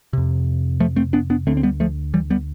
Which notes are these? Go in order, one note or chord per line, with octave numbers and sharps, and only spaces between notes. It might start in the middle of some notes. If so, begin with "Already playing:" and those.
F2 C3
F3 A3
A3 C4
B3 D4
B3 D4
D2 D3 A3 C4
C4
G3 B3
F3 A3
E3 G3
G3 B3